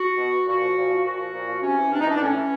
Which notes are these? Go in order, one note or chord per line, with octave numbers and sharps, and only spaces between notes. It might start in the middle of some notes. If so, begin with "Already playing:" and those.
Already playing: F#4
B2
A#2 F#4
F3
A#2
F3
A#2 F#4
F3
A#2
F3
C3 C#4
E3
C3 D4
D#4
E3 D4
D4
A2 C#4
E3